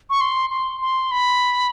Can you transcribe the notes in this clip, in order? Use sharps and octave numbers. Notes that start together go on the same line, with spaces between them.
C#6
C6
C6
C6
B5